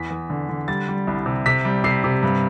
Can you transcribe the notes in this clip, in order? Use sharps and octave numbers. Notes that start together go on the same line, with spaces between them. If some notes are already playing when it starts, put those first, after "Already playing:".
Already playing: E2 B6
E2
D3
D3
G3 A6
G3
C2
C3
C3 B6
G3
C3 C7
C3
G2